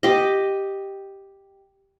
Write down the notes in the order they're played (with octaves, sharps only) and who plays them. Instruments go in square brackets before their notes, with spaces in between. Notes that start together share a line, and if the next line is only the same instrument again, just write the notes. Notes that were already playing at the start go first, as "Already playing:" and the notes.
[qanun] G4 D#5